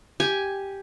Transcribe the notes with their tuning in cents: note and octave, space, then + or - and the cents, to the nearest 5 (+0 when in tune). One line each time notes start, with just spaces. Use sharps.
G4 +0 G#5 +0